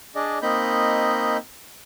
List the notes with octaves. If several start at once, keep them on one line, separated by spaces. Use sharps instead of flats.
D4 G#4 D5 D#5
A#3 C4 D#4 D#5 B5 G6